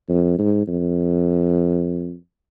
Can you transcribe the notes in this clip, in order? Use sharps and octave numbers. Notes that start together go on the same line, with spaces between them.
F2
G#2
F2